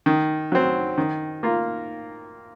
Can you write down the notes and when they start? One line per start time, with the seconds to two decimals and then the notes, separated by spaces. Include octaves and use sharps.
0.06 D#3
0.52 F#3 C4
0.98 D#3
1.43 A#3 F4